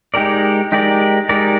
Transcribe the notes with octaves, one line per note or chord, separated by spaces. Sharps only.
G#3 D#4 G4 A#4 D5
G#3 D#4 G4 A#4 D5
G#3 D#4 G4 A#4 D5